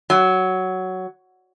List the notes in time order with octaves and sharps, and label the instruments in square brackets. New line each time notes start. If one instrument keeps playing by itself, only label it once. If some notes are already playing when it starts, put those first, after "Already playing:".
[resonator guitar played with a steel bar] F#3